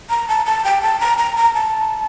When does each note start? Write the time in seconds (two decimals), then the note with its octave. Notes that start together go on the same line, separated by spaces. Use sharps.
0.10 A#5
0.28 A5
0.46 A5
0.65 G5
0.82 A5
1.00 A#5
1.18 A#5
1.36 A#5
1.54 A5